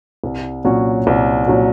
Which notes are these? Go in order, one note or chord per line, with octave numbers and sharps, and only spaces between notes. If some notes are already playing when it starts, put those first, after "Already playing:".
C2
A#2 F#3 C#4 F#4
C2
A#2 F#3 C#4 F#4